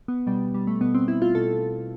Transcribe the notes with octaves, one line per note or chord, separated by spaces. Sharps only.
B3
B2 G3
G3
A3
B2 B3
C4
E4
F4
B2 A4